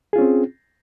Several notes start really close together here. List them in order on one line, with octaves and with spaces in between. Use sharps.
G#4 F4 C#4 C4